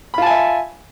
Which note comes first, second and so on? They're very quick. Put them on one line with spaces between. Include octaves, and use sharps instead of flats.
B5 F4 A5 G#5 E5